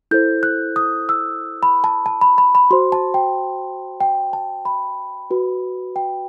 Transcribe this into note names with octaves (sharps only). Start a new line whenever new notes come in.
E4 A4 C5 G6
F#6
D#6
E6
B5
A5
A5
B5
B5
B5
F#4 C5 C6
A5
G5
G5
A5
B5
F#4 B4
G5